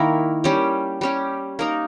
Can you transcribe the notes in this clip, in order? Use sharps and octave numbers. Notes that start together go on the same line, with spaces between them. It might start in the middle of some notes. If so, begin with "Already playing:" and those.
Already playing: D#3 A#3 E4 A#4
G3 C#4 G4
G3 C#4 G4
A#3 D#4 A#4